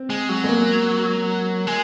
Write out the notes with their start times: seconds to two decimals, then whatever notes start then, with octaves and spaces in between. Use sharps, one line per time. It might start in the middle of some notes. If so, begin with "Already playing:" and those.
Already playing: C4
0.10 G#3
0.29 F#3
0.44 G#3
0.49 A#3
1.67 G#3